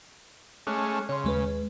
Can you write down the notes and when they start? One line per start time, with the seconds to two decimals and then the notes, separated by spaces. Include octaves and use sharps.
0.67 G#3 A3 C#4 D6 F6 F#6
1.09 C#3 C#5 C6
1.24 D#2 G#3 B4